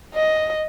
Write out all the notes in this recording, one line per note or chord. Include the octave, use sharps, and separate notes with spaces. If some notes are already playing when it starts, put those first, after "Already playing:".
D#5